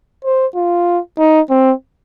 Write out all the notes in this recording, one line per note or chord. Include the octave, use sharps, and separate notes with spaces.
C5
F4
D#4
C4